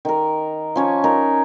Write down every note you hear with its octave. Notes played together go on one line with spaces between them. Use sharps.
D#3 A#4
F3 C#4 C#5
D#4 A#4